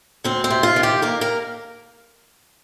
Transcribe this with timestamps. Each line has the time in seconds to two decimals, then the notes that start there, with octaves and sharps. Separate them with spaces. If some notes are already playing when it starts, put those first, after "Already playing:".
0.24 D2 C4
0.44 C4
0.50 C3
0.63 F4
0.76 D#3
0.83 G4
1.02 A#3 A#4
1.21 A#4